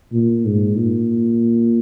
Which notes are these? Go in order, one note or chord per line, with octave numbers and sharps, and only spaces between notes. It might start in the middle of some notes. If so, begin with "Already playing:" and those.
A#2
G#2
A#2